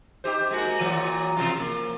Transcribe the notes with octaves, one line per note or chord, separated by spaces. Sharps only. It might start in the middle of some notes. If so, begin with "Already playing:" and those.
D#4 G4 C5
G#3 A#3 F#4
A#2 E3 F#3
C3 F3 F4
A#3